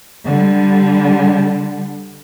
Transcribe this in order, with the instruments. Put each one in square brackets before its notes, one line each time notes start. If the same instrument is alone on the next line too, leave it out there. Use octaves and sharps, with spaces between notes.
[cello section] D3 G3